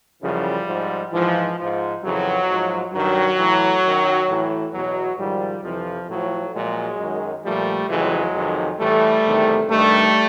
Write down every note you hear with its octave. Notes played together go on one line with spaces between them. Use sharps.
F#2 C#3 E3 F3 G3
G#2 F3
G#2 E3 F3
F3
G#2
F2 C#3 E3 F#3
G#2 F3
G2 D#3 F#3
A2 E3
F#2 D#3
A2 E3
E2 B2 F#3
G#2 D#3 F3 G3
F2 C3 E3 F3
A2 F3 F#3
A#2 F3 F#3 G#3
F#2 D#3
A#2 F3 G3 A3
F2 C#3 E3 F#3 G#3
F2 C3 D#3
A2 E3 G3 A3
E2 C3 D#3
G2 D#3 G3 A3